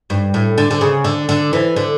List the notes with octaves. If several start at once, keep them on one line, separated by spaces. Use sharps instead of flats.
G2
A2
D3
D3
C#3
D3
D3
E3
D3